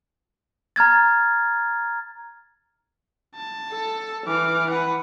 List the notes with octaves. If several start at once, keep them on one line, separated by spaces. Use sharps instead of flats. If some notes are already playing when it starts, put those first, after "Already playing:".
A#5 F6 G#6 A6
A5
A4
E3 D6 F6
B4 F#5